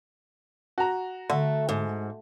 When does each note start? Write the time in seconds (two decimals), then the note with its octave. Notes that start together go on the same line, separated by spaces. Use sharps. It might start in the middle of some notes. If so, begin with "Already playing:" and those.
0.78 F#4 A#5
1.30 D3 A3
1.69 G#2